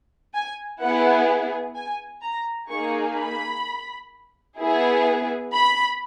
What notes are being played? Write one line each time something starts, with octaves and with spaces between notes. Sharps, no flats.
G#5
B3 E4 G#4 F#5
G#5
A#5
A#3 D#4 G#4 C#6
B5
B3 E4 G#4
B5